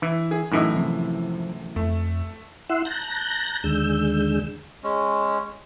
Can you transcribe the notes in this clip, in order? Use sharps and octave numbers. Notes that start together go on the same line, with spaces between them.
E3 E4
G#4
F#2 A2 E3 D#4 E4 D#5
C3 F3
F2 A3
E4 F#5 C6 E6
A5 A#5 F#6 G6 A#6
D#2 D3 G#3 E6 G6
G#3 C#4